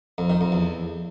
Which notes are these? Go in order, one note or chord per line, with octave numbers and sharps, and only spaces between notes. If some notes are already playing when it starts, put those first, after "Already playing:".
F2
D#3
F2
E2